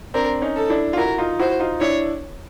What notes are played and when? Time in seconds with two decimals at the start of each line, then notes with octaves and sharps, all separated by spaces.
0.14 C4 D4 A#4
0.42 C#4 D#4
0.56 A4
0.70 D4 E4
0.93 F4
0.97 E4 F#4 A#4
1.18 D#4 F4
1.39 E4 F#4 C5
1.60 D#4 F4
1.81 D4 E4 C#5